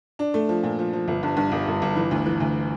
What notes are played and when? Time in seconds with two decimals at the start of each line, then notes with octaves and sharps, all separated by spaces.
0.19 D4
0.34 A3
0.49 F3
0.64 A#2
0.79 F3
0.93 F3
1.08 G1
1.23 G2
1.37 G2
1.52 G1
1.67 G1
1.82 G1
1.96 E3
2.11 D2
2.26 E3
2.40 D2